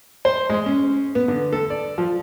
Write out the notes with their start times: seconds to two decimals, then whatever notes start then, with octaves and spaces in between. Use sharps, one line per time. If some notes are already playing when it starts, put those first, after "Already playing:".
0.25 C5
0.50 G#3
0.66 C#4
1.15 B3
1.28 D3
1.53 A4
1.70 D5
1.98 F3